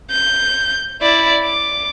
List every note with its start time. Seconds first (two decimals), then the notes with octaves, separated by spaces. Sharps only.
0.11 G6
1.02 E4 D5
1.44 D6